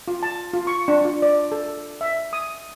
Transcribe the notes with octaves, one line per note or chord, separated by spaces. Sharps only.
F4
A5
F4
C#6
D4
F4
D5
A4
E5
D#6